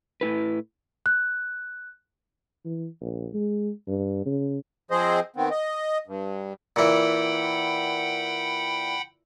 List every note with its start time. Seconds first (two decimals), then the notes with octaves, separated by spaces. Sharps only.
0.21 A2 E4 B4
1.06 F#6
2.65 E3
3.01 A#1
3.34 G#3
3.87 G2
4.26 C#3
4.91 F3 C4 G#4 C5 D#5
5.36 D#3 B3 C4
5.51 D#5
6.07 G2
6.76 A#2 E3 F#5 G5 B5